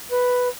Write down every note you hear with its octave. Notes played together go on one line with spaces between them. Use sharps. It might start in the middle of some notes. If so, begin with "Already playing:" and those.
B4